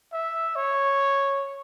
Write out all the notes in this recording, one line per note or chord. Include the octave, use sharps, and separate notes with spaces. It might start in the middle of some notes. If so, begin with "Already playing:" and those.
E5
C#5